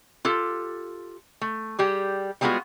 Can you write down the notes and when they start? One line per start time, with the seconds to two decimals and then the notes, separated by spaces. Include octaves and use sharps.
0.25 F4 G4 A4
1.41 A3
1.79 G3 G4 G#4
2.41 G3 G#3 B3 F4 F#4 G#4